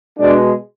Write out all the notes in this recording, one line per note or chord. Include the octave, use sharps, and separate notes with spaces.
B2 G#3 D4